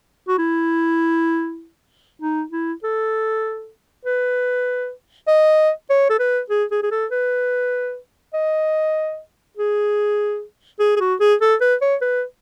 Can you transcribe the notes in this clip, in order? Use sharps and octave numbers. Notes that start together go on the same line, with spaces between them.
F#4
E4
D#4
E4
A4
B4
D#5
C#5
A4
B4
G#4
G#4
G#4
A4
B4
D#5
G#4
G#4
G#4
F#4
G#4
A4
B4
C#5
B4